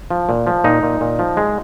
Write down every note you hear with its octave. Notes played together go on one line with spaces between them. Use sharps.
F3
A#2
F3
A#2 D#4
A#2
A#2
F3
G#3